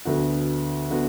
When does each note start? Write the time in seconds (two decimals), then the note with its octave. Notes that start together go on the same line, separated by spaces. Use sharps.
0.05 D2 D3 B3 F#4
0.90 D3 B3 F#4